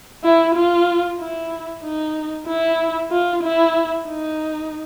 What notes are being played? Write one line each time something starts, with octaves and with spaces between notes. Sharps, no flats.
E4
F4
E4
D#4
E4
F4
E4
D#4